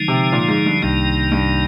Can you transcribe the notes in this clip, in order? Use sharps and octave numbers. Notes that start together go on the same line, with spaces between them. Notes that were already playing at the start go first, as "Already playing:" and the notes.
Already playing: D3 F3 G#3 D#4
C3
A#2
G#2
G2
C2 G2 C3 D#3 A#3 D#4
G2